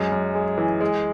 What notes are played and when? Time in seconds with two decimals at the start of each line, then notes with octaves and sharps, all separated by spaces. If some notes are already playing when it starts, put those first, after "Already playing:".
Already playing: F#2 G#3
0.12 F#2
0.35 G#3
0.58 E3
0.81 G#3